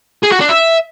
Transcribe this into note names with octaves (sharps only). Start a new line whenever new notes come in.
G#4
F#4
D4
E5